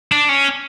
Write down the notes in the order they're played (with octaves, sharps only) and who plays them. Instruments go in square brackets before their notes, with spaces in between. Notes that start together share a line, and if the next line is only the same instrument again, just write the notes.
[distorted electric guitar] D4
C#4